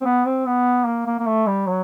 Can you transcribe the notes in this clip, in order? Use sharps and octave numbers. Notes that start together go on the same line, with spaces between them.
C4
B3
C4
B3
A#3
A#3
A#3
A3
G3
F#3